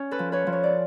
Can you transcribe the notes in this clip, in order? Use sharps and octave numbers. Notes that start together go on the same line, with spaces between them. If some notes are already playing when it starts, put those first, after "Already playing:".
Already playing: C#4
A4 B4
F3
B4 C#5
F3
C#5
D5